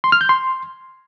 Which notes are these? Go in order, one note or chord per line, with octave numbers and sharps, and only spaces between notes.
C6
F6
G6
C6